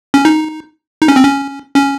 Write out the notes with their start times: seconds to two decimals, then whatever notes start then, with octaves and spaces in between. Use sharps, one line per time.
0.14 C#4
0.25 D#4
1.01 D#4
1.08 C#4
1.16 C4
1.23 C#4
1.76 C#4